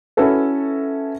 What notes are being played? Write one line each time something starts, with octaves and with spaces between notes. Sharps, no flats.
C#4 E4 F#4 A4 B4